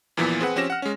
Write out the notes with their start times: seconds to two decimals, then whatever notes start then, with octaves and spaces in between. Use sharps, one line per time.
0.17 E2 A#2 E3 F3 B3 B6
0.41 C4 G#4 B4 F#5
0.56 F3 C4 C#4 G4 A#6 E7
0.70 F#5 F6
0.82 G#3 C#4